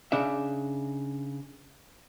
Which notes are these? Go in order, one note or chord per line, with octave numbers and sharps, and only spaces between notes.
C#3 D4 E5